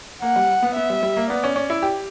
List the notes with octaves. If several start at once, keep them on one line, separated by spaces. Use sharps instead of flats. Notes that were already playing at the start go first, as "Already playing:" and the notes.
A#3 F#5
G3
B3
B3 E5
G3
G3
A#3
B3 D5
C#4
C#4
E4
G4